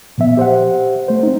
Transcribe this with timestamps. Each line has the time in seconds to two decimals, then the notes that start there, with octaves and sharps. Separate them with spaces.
0.18 A#2 F3 B3 E5
0.37 G4 C5 E5 F#5
1.08 A3 C5
1.23 C4 D#4